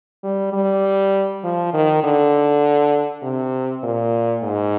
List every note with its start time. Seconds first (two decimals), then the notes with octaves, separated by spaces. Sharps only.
0.24 G3
0.53 G3
1.44 F3
1.73 D#3
2.04 D3
3.23 C3
3.83 A#2
4.43 G#2